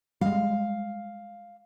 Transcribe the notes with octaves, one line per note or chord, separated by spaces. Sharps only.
G3 G#3 F5